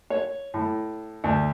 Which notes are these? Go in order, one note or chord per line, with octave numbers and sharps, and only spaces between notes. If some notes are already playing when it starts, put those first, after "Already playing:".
C#5
A2
D2